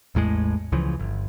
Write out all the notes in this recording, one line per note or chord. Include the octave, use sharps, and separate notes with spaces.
A1 E2 A2 G#3
C#2 C#3 E3 F3
G1